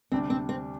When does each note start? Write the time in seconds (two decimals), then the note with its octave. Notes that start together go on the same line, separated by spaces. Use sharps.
0.12 D2 C3 G3 C4 D4
0.30 C4
0.49 C4